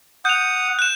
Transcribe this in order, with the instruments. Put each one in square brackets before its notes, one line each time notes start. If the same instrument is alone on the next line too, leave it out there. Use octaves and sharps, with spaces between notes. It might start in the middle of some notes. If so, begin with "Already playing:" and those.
[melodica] F#5 D#6 [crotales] G6 F7
[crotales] F#6 E7